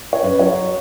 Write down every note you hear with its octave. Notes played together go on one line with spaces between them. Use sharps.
C#5
F#2 B4
F#3 C#5